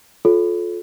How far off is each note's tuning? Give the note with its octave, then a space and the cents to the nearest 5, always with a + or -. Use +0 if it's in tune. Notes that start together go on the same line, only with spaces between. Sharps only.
F4 +20 A4 -25 C#5 +0